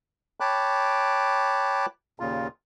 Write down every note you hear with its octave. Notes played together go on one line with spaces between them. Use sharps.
C#5 G5 A5 B5 D6 F#6
D#2 A#2 C#3 F4